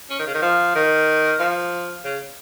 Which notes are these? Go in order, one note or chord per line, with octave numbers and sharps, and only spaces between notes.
C#4
D#3
C#3
D#3
F3
D#3
F3
C#3